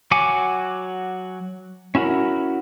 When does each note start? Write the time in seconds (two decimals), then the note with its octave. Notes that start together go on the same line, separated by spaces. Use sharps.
0.11 F#3 F#4 F#5 G#5 D6
1.95 C#4 E4 F#4 A#4